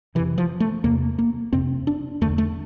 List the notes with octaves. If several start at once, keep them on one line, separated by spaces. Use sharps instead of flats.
F2 C3 E3
F3
A3
E2 C3 A#3
A#3
F2 C3 C4
D4
E2 D3 A3
A3